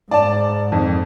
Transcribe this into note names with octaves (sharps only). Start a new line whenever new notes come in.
G#2 D5 A5
F2 D#3